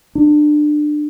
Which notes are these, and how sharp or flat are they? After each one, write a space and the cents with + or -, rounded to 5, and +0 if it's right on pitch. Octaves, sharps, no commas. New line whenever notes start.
D4 +25